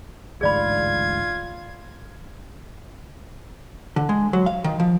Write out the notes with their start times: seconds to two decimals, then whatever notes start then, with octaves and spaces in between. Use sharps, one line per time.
0.41 A1 D2 G#2 F4 G#4 D5 B5 G#6
3.96 D3
4.09 G#3
4.33 F#3
4.46 F5
4.64 D#3
4.80 F3